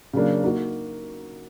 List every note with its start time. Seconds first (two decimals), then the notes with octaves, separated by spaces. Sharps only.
0.13 C#3 F#3 A#3 D4
0.44 A#3 D#4 F#4